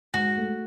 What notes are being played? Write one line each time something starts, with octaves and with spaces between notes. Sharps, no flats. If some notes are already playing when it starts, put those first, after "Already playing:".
G#2 F#4
A3